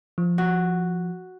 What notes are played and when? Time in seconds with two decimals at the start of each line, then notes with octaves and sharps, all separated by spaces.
0.18 F3
0.38 F#4